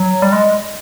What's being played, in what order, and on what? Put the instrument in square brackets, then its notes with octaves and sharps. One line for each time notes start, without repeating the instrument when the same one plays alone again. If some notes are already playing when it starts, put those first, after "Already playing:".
Already playing: [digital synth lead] F#3
G3
G#3